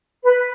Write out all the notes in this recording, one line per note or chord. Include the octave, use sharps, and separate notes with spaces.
B4